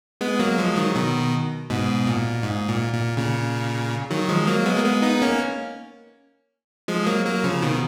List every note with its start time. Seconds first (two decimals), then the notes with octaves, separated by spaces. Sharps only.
0.21 G#3 B3
0.39 F#3 A#3
0.58 F3 G#3
0.77 D#3 F#3
0.95 B2 D#3
1.70 G#2 B2
2.07 A#2
2.43 G#2
2.68 A#2
2.93 A#2
3.17 A#2 C#3
4.11 D#3 F#3
4.29 F3 G#3
4.47 F#3 A#3
4.66 G#3 B3
4.77 A#3
4.84 G#3 B3
5.02 B3 D#4
5.22 A#3 C#4
6.88 F3 G#3
7.06 F#3 A#3
7.25 F#3 A#3
7.44 C#3 F3
7.62 B2 D#3